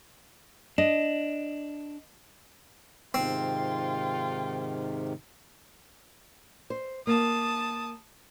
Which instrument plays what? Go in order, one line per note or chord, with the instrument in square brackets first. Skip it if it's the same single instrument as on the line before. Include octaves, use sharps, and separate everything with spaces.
[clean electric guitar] D4 [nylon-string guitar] D#5
[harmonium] G#2 C3 D#3 [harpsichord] C4 [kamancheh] F4 G5
[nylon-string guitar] C5
[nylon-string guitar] A#3 [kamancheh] A5 D#6